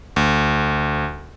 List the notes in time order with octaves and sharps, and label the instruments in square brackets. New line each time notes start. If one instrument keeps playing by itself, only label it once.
[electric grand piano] D2